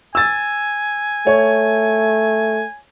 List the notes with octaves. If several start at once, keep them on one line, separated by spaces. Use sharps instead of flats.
G#5 E6 A6
A3 C#5